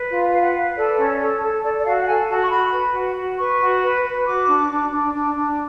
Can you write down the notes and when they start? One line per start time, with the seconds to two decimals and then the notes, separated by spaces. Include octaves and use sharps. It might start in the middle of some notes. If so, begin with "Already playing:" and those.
Already playing: B4
0.10 F4
0.32 B4 F5
0.43 F#5
0.53 B4 F5
0.76 A4 D5
0.98 C#4
1.20 A4
1.41 A4
1.63 A4 D5
1.79 D5
1.85 F#4 F5
2.01 F#5
2.07 A4 G#5
2.29 F#4 A5
2.42 C#6
2.50 F#4 B5
2.72 B4
2.94 F#4
3.16 F#4
3.38 B4 C#6
3.60 F#4
3.82 B4
4.04 B4
4.26 F#4 D6
4.48 D4
4.69 D4
4.91 D4
5.13 D4
5.35 D4